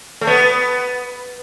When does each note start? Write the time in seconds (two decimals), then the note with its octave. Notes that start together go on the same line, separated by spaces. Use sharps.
0.21 A3
0.27 B3